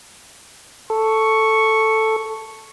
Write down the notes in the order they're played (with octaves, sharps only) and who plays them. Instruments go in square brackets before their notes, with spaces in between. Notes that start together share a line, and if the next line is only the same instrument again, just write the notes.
[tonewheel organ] A4 [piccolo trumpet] C#6